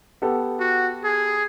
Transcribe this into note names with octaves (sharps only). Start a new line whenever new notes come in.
B3 G4 A4
F#4
G#4